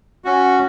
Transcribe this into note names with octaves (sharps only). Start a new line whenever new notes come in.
C#4 F#4